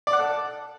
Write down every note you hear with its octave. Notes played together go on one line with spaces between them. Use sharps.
D5
F#5
A4